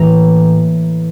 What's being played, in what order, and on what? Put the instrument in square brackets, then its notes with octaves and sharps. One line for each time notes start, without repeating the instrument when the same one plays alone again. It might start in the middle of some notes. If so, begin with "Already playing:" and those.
Already playing: [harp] A2 E3 A#3 A#5